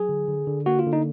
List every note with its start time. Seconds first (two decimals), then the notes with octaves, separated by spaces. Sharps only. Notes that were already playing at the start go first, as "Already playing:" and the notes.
Already playing: F#3 G#4
0.09 D3
0.28 D3
0.47 D3
0.66 A#3 F#4
0.79 F4
0.87 D3
0.93 D#4